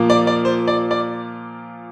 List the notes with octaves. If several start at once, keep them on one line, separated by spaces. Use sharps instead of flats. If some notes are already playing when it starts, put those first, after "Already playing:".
Already playing: A#2 F3 A#3 F4
D5
D5
C5
D5
D5